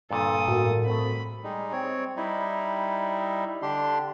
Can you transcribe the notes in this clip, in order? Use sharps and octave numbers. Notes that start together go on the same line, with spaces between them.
G2 A#2 D3 A4 D#6
A2 F#4 A#4
A3 C4 B5
G3 G#3 D#4
C4 C#5
G3 D#4 E4
D3 D4 G4 C6